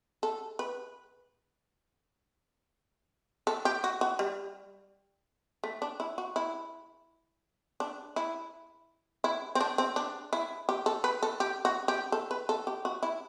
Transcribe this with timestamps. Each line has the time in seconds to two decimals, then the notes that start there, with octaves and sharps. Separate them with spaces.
0.23 A4
0.59 B4
3.47 A4
3.65 G4
3.84 F#4
4.01 F#4
4.19 G3
5.64 A3
5.82 D4
6.00 E4
6.18 F#4
6.36 E4
7.80 D4
8.16 E4
9.24 E4
9.55 C4
9.61 D4
9.78 C4
9.96 D4
10.33 E4
10.69 G4
10.86 A4
11.04 B4
11.23 A4
11.40 G4
11.65 F#4
11.88 G4
12.12 A4
12.31 B4
12.49 A4
12.67 G4
12.85 F#4
13.03 E4